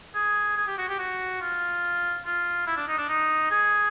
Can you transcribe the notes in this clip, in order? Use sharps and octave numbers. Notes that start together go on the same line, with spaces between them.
G#4
G#4
G4
F#4
G4
F#4
F4
F4
E4
D4
D#4
D4
D#4
G#4